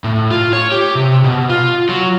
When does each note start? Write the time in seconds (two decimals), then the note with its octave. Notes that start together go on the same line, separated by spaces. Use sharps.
0.04 A2
0.31 F4
0.53 C#5
0.72 G4
0.95 C3
1.24 B2
1.49 F4
1.89 F#3